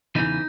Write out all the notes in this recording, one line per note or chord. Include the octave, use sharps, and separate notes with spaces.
E2 C#3 E3 D#4